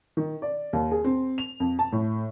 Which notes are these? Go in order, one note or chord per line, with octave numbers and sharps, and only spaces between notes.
D#3
D5
D#2
G#4
C4
F7
F2
A5
A2